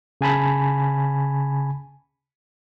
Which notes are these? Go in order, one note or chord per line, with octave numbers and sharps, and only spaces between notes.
C#3 G#5 A5 B5